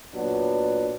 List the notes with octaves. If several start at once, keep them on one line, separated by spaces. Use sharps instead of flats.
A#2 F#3 B3 D4